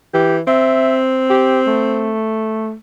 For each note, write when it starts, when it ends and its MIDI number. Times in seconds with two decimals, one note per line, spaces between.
0.14 0.41 52
0.14 0.36 67
0.47 2.17 60
0.47 0.98 76
1.30 1.61 67
1.67 2.74 57